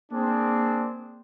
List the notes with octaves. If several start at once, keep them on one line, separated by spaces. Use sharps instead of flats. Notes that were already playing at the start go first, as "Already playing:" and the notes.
A#3 C4 D4 G#4